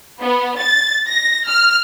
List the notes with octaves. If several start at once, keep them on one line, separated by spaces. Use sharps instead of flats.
B3
A6
A#6
F6